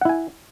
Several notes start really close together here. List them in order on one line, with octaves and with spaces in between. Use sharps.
F#5 E4 G#5